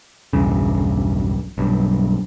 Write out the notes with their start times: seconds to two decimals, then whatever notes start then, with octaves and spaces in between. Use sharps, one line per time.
0.33 B1 E2 G2 C#3
1.58 B1 G2